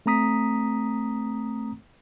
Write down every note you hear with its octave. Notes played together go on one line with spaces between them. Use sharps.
A3 C4 A#5 D#6 B6